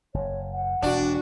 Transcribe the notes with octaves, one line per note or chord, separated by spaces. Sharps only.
F#1 C#5
F#5
E1 D4 F#4